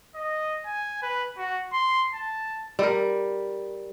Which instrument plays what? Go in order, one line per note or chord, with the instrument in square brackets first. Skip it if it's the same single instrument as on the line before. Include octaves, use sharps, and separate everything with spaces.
[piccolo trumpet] D#5
G#5
B4
F#4
C6
A5
[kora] G3 A#4